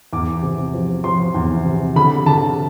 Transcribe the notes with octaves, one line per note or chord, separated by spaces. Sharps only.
E2 D6
C3
F3
F3 C6
E2
C3
D3 B5
D3 A5